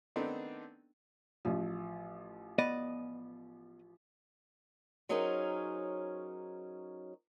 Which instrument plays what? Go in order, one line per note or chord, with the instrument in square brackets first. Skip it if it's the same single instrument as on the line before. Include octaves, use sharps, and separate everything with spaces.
[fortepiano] D#3 A3 B3 C4 D4 D#4
[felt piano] A1 F3
[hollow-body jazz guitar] B3 D5 D#5
[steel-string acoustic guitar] F#3 C#4 D#4 G#4 A#4 C5